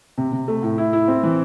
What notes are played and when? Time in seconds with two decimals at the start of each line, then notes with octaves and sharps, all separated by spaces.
0.18 C3
0.32 C3
0.48 A3
0.63 A2
0.78 E4
0.93 E4
1.08 C4
1.23 E3